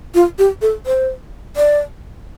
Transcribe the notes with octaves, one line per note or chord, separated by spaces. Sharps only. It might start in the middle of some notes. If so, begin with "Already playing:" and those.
F4
G4
A4
C5
D5